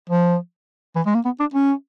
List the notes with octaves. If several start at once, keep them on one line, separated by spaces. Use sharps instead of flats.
F3
E3
G#3
A#3
B3
D4
C#4